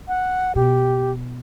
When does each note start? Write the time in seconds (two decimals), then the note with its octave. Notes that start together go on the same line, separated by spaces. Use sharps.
0.08 F#5
0.55 B2 G4